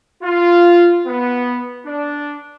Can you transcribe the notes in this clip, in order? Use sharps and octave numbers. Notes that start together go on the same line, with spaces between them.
F4
B3
D4